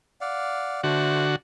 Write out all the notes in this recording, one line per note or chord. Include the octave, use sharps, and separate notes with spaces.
D5 F5 F#5
D3 A3 F#4 C5